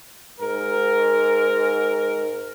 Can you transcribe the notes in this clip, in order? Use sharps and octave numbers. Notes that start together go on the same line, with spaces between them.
G#2 A#4